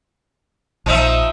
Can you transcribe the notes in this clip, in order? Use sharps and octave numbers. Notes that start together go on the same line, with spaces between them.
A#1 F3 D#4 E5